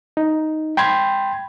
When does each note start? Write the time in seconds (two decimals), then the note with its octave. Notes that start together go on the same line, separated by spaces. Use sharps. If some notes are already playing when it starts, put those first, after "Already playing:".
0.17 D#4
0.77 G5 B5 C6 G#6